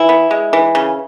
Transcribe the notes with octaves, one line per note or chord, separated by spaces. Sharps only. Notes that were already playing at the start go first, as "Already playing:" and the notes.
Already playing: E3 E4
B3
G#3
E3
C#3